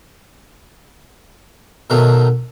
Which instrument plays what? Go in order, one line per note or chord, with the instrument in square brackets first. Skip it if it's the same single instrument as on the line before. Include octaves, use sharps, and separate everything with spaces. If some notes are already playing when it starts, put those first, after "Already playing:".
[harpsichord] B2 D#3 F#3 A3